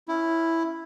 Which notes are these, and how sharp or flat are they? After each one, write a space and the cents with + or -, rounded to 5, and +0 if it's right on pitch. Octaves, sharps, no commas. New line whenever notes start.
C#4 +0 E4 +0